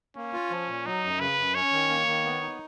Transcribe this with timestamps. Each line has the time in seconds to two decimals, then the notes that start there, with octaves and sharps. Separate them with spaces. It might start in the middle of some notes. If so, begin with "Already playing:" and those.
0.16 A#3 C#4
0.33 F4
0.51 F3
0.69 A#2
0.86 F#3 D#4
1.04 F#2
1.20 C#3 B4
1.38 F#2
1.55 C#4 C#5
1.72 D#3
1.89 A#3
2.07 D#3
2.24 B3
2.41 D#4